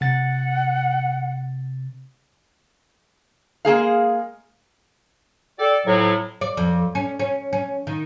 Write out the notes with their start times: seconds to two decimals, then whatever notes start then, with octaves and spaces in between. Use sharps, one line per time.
0.01 C3 F#5 A6
3.65 G#3 A#3 G#4 F5
5.59 G4 A4 D5
5.87 F2 A2 F#3
6.41 D5
6.57 F2
6.95 C#4
7.19 C#4
7.53 C#4
7.87 D#3